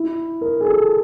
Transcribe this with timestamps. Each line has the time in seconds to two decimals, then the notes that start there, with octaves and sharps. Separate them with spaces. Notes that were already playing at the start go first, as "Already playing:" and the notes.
Already playing: E4
0.41 A#4
0.60 G#4
0.66 A4